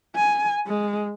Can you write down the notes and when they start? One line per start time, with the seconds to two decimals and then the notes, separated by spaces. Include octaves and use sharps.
0.15 G#5
0.67 G#3